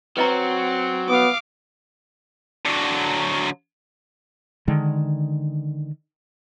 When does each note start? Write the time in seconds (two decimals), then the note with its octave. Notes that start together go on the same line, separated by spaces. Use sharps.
0.17 F#3 C4 B4 D#5 A#5
1.10 B3 F5 D6 D#6
2.65 D3 F#3
4.67 D3 D#3 G#3